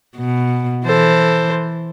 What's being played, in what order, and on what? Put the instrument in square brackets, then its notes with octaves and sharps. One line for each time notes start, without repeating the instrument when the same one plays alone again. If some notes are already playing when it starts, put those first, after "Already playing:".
[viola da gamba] B2
[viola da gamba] E3 [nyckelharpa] A4 C5